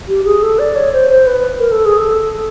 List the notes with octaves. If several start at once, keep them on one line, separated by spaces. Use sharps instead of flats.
G4
G#4
A4
D5
C#5
C5
C5
B4
A#4
A4
G#4
A4